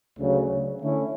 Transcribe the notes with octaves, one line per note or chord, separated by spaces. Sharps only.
D2 C#3 F#3
D3 A3 C#4 E4